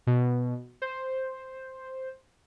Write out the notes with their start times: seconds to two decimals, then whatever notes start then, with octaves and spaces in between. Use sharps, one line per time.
0.07 B2
0.82 C5